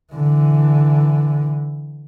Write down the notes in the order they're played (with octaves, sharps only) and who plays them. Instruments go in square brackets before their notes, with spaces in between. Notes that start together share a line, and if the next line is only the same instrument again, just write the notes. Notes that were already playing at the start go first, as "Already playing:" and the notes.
[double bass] D3 E3